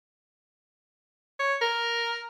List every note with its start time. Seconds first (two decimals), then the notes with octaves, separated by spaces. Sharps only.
1.40 C#5
1.62 A#4